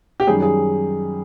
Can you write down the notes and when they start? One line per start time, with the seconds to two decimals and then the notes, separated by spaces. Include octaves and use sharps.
0.20 G4
0.27 F#2 D#3 G3 G#4
0.42 G#4